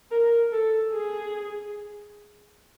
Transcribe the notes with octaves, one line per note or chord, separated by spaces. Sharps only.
A#4
A4
G#4